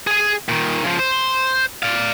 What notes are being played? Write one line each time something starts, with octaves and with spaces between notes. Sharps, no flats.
G#4 G#5
A#2 D#3
C#3 F3
C5
D5 F5